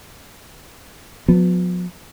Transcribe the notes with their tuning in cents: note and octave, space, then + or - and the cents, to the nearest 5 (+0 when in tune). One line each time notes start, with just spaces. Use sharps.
F3 +45 B3 +15